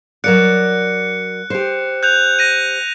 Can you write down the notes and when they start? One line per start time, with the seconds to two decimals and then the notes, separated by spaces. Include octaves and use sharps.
0.24 F#3 A#4 D5 F#6 C#7
1.50 G4 C5
2.03 F#6 G6 F7
2.39 A#6 D#7